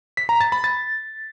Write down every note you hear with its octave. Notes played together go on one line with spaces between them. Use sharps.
B6
A#5
A6
B5
A6